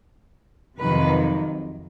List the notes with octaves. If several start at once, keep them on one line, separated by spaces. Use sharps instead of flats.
F2 C3 D#3 F#3 B4